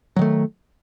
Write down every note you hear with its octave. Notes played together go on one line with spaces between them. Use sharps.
D#3 F#3 A3